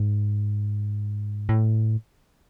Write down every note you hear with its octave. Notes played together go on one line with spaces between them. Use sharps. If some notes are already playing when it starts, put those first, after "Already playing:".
Already playing: G#2
A2